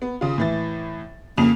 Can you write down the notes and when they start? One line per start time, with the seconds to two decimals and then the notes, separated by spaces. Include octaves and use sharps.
0.02 B3
0.21 C#3 F4
0.38 A2 E3 A6
1.38 F2 C#3 A#3 F7